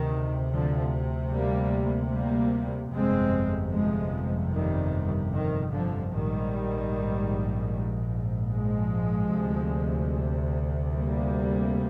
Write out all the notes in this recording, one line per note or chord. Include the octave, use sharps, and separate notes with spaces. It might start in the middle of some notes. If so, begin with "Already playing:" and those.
Already playing: D2 C3 D#3
D3 F3
G3 A#3
G3 A#3
G1 F2 C3 G#3 C4
F3 G#3
D#3 G3
D#3
D3 F3
A#1 G#2 D#3 G3
F3 G#3
D2 C3
G3 A#3